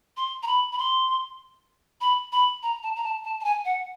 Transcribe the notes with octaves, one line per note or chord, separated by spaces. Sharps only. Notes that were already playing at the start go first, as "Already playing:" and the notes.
C6
A#5
B5
B5
C6
B5
B5
A#5
A5
A#5
A5
A5
A5
G#5
F#5